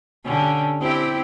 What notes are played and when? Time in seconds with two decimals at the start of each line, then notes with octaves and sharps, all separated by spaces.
0.24 D3 C#4 G4
0.81 C4 E4 G4